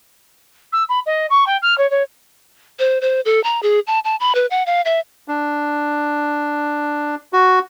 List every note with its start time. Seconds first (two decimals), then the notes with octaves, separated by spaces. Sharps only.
0.73 E6
0.89 B5
1.06 D#5
1.30 C#6
1.47 G5
1.62 F6
1.78 C#5
1.91 C#5
2.79 C5
3.01 C5
3.25 A4
3.44 A#5
3.63 G#4
3.87 A5
4.04 A5
4.20 B5
4.35 B4
4.51 F#5
4.66 F5
4.85 E5
5.28 D4
7.33 F#4